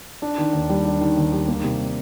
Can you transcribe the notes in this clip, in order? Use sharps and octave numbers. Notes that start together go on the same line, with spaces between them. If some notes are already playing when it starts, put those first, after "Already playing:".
D4
D#3
D#2
G3
D4
D#3
D#2
G3
A#3
C3